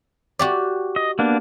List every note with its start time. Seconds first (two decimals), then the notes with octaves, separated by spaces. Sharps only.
0.39 F#4 G4 D5
0.96 D#5
1.19 A#3 B3 D4